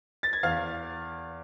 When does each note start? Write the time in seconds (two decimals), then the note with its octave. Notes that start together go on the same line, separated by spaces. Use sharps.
0.23 A6
0.33 G#6
0.43 E2 F5 F6